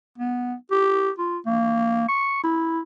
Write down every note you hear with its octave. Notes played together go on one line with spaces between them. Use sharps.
B3
G4
F4
A#3
C#6
E4